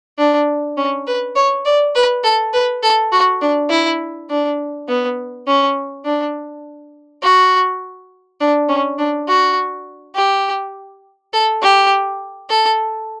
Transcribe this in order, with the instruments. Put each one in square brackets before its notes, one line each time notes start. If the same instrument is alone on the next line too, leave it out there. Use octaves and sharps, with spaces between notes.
[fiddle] D4
C#4
B4
C#5
D5
B4
A4
B4
A4
F#4
D4
E4
D4
B3
C#4
D4
F#4
D4
C#4
D4
F#4
G4
A4
G4
A4